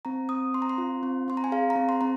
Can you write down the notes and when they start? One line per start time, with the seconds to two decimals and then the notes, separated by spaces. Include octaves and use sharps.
0.05 C4 A#5
0.29 C4 D#6
0.54 C4 C6
0.62 A#5
0.69 C6
0.78 F4
1.03 C4
1.28 C4 C6
1.37 A#5
1.44 G#5
1.52 G#4 F5
1.70 A#5
1.76 C4
1.89 C6
2.01 C4 A#5